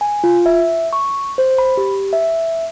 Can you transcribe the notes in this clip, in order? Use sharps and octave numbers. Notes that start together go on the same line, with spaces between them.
G#5
F4
E5
C#6
C5
B5
G4
E5